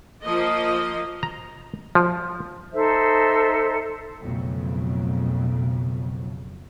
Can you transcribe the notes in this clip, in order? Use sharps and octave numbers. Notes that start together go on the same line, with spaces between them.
F3 A#3 D#5
A#5
F3
D#4 A4 C5 E5
B1 F2 C#3 F#3 A3